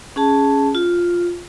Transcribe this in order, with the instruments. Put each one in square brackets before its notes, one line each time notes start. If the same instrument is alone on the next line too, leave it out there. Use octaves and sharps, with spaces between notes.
[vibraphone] C#4 G#4 A5
F4